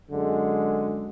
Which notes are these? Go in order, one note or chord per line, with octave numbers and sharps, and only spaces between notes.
F#2 D3 G#3